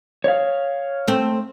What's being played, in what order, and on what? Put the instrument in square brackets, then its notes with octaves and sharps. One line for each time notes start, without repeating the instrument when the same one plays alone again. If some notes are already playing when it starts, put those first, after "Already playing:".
[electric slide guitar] C#5 F5
[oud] A3 C4